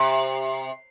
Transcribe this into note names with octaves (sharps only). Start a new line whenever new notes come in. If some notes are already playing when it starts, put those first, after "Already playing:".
Already playing: C3